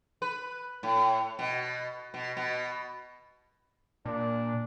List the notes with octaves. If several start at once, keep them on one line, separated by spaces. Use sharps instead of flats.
B4
A2
B2
B2
B2
A#2 D4